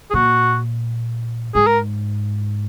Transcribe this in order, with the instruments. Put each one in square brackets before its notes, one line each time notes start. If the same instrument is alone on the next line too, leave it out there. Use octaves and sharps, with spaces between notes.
[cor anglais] G#4
[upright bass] A#2 [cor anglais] F#4
[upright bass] G#2 [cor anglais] G#4
[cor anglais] A#4